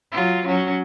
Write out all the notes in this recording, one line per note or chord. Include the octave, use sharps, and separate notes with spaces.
F#3 F4
F#3 C#4